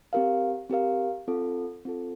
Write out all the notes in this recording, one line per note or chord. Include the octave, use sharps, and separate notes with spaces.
C4 G4 A#4 F5
C4 G4 A#4 F5
C4 F4 A4
C4 F4 A4